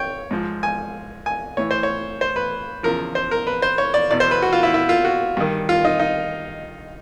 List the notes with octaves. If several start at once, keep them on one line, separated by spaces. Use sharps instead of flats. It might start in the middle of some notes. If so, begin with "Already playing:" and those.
Already playing: C#5 G5
G#2 F3
G#5
G#5
A2 E3 C#5
C5
C#5
C5
B4
E2 C#3 F3 A#4
C5
A#4
B4
C5
C#5
D5
E2 B2 D5
C5
B4
F#4
F4
E4
E4
F4
F#4
G2 D#3
F4
D#4
D#4